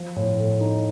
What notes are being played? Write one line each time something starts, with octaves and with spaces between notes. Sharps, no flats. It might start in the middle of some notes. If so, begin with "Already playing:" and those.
Already playing: F3
A2
A3
D#4